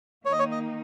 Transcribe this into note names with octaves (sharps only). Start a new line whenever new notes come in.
D#3 A#3 D#4 C#5
D#5
C#5
D#5